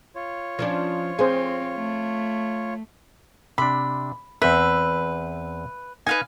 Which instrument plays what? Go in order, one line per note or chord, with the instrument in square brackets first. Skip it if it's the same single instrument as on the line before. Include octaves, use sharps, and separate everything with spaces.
[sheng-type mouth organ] F4 C#5
[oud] F3 C#4 D4
[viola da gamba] C4 [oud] G#4 [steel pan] C5 F5
[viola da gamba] A3
[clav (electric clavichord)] C3 D4 [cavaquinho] B5
[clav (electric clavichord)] E2 C4 [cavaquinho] B4 E5
[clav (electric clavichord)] D#4 [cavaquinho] B4 F5 G#5